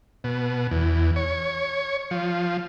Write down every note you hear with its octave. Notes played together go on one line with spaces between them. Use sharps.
B2
E2
C#5
F3